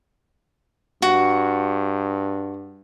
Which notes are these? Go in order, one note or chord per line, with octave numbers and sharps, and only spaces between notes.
G2 F#4